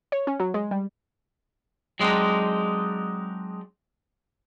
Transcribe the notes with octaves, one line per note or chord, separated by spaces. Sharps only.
C#5
C#4
F#3
G#3
G3
F#3 G#3 C4 D4 D#4